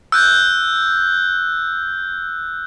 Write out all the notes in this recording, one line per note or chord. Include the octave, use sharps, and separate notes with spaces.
E6 F#6 G6